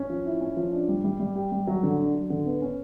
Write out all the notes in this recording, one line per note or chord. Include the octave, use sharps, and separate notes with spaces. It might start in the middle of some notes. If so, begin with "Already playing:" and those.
Already playing: C#4
F3
E4
C#4
F3
D4
G3
G3
G3
G4
G3
F#3
D3
D4
F#3
D3
B3
C#4